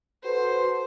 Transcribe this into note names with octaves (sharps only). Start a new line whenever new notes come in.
F#4 A4 B4 C5